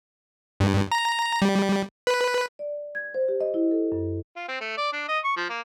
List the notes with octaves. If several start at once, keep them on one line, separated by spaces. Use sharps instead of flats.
G2
A#5
G3
B4
D5
G#6
C5
G4
D#5
E4
A4
F#2
F4
C4
A3
D5
D4
D#5
C#6
F3
A#3